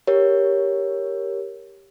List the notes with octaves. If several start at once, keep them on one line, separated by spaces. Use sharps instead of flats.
G4 A#4 C#5